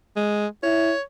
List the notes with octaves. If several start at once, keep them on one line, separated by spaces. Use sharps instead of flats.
G#3
E4 C#5